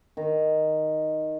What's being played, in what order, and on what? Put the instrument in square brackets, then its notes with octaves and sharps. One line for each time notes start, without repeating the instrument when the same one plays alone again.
[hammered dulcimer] D#3